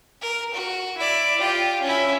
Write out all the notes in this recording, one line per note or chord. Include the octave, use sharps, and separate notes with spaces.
A#4
F#4
E4 D5
F4 G4
C#4 E4